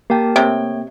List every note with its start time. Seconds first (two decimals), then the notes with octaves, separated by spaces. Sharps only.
0.10 A#3 G4 A#4 G5 A5
0.36 C3 A3 C#5